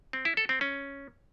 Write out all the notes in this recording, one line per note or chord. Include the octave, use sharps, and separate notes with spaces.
C4
E4
A4
C4
C#4